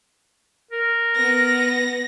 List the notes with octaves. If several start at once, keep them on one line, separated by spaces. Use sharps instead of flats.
A#4
B3 A#6